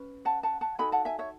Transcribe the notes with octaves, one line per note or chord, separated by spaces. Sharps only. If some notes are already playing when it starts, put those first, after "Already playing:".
Already playing: C#4 B4
F#5 A5
F#5 A5
F#5 A5
D#4 F#4 A4 G#5 B5
F#5 A5
E5 G#5
C#5 E5